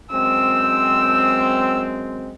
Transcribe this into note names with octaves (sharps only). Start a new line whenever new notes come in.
F#2 G#3 C4 E6